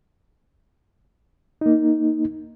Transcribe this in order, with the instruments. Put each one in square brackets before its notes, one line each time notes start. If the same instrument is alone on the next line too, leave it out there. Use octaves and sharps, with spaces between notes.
[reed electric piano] A#3 D#4